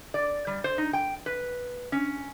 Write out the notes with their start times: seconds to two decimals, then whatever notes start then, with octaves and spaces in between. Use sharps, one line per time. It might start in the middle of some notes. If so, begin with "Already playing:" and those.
0.14 D5
0.47 G3
0.64 C5
0.78 D#4
0.93 G5
1.26 B4
1.92 C#4